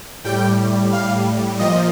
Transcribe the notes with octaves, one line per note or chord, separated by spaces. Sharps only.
A2 G3 G5
F5
A#2 F3 D#5